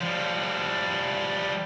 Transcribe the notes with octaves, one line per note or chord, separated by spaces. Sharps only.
F3 G3